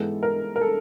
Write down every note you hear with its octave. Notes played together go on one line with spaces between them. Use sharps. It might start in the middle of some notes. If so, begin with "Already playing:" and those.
Already playing: G#2 E3 G#3 B3 A4
A#4
A#4
A4